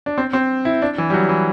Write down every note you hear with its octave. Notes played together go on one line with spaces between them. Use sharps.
D4
C4
C4
E4
D4
E3
G3
F#3
E3